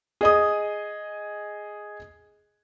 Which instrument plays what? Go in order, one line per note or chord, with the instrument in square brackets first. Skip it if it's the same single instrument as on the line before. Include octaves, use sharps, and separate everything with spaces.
[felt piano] G#4 D#5 D#6